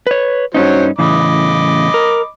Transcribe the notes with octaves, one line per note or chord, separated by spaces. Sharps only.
B4 C#5
G2 F#3 C#4 D#4 C5 C#5
A2 C#3 E3 D#5 B5 D6
A#4